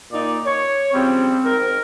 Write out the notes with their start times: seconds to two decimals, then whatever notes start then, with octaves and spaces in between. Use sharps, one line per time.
0.12 A#2 D#4 D5
0.45 C#5
0.94 C#3 F3 G3 C4
1.44 G#2 A#4